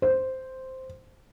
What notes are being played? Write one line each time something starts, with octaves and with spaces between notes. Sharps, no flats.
C5